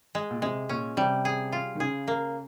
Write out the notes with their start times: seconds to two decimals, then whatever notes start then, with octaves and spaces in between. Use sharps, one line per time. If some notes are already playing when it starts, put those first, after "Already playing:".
0.15 G#3
0.31 A#2
0.42 C3 G#3
0.69 A#2 C#4
0.97 C3 G3
1.25 G#4
1.52 F4
1.75 D#3
1.80 C#3 G#4
2.08 A#3